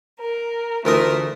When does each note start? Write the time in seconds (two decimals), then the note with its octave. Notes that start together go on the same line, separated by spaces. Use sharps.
0.19 A#4
0.85 D2 E3 A3 F4 A#4 D#5